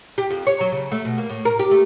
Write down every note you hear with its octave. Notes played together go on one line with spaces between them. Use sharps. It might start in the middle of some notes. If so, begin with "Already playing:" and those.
G4
F2
C#5
F#3
C#3
A3
B2
A#3
A2
A#4
G4
A3